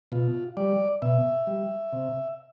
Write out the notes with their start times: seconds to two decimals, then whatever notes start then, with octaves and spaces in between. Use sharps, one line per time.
0.12 B2 F4
0.57 G3 D5
1.02 B2 E5
1.47 G3
1.93 C3